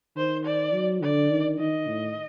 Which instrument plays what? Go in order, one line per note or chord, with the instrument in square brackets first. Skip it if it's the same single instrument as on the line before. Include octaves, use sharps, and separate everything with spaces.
[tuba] D#3 [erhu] C5
[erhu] D5
[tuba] F#3
[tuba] D3 [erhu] D5
[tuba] D#3
[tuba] D#3 [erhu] D#5
[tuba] A2